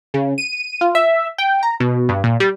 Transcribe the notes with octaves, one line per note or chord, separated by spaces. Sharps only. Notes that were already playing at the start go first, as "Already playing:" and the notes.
C#3
D#7
F4
E5
G5
A#5
B2
G2
A#2
G3